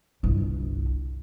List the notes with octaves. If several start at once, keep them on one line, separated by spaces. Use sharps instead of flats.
G1 C2